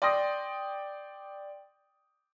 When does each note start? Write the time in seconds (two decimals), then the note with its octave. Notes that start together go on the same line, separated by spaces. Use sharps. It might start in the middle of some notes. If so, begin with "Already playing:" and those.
0.02 D5 G5 C6 D#6 A#6